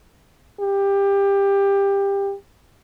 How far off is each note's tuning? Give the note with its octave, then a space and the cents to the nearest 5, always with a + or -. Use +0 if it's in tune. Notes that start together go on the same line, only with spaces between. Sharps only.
G4 +20